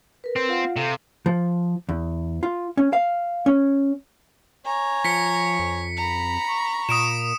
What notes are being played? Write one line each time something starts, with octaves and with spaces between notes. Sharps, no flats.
A#4 B4
C4
F4 F5 F#5
C3 A4 F5
F3
E2
F4
C#4
F5
C#4
C#5 G#5 A#5
F3 B6 C#7
F2
A#5 B5
C#6
A#2 D#6 D7 E7